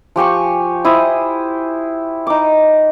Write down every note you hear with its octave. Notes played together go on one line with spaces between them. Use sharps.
F3 G4 G#5 C#6
E4 C5 D#6
D#4 D6